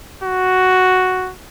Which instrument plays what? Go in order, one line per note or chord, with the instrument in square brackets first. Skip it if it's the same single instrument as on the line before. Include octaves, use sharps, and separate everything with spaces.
[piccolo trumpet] F#4